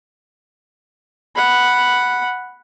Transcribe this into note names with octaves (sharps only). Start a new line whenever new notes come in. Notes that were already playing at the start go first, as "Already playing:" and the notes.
F#5 B5